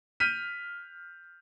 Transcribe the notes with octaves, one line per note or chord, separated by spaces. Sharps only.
F6 G6 B6 D#7